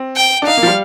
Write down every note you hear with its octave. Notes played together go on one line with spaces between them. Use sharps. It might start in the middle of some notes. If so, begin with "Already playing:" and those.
Already playing: C4
G5
D4
D#4 F5
A#3
F3
G3